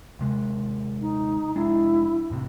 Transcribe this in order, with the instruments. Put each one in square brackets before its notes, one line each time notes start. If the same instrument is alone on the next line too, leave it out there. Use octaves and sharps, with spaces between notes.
[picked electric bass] D#1 C3 G#3
[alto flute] D#4
[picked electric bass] F1 G#3 D4 [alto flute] E4
[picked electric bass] E2 A2 C3